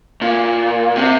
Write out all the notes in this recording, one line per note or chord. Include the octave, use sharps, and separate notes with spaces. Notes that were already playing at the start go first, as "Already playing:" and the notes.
A#2
C3